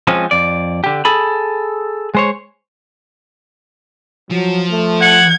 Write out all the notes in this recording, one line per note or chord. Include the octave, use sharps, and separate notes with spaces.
F3 G#3 C4 C#4
F2 D5
D3 G4
G#4 A4 B5
G#3 C5 C#5
F3 F#3
A3
F#5 G#6